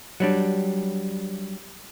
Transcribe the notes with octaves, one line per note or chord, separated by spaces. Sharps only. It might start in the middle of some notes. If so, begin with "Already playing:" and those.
F#3 G3 D4